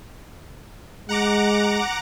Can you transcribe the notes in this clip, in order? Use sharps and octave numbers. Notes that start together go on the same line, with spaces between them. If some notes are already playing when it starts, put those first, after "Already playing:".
G#3 F#5 A#5 D6